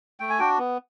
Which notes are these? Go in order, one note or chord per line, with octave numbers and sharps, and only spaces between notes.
A3 G5
G#5
D4 F#4 G5
B3